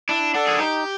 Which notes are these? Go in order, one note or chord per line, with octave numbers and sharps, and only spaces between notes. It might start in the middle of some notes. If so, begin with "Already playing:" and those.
D4 E4
D4 A4 D5 F#5
G#4
D#4 G4